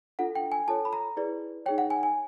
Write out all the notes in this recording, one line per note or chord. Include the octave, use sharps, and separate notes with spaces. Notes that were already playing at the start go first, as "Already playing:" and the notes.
D4 F4 A4 F#5
G5
G#5
F4 A4 C#5 A5
B5
A#5
E4 G#4 B4 D5
D#4 G#4 C#5 G5
F#5
G#5
G#5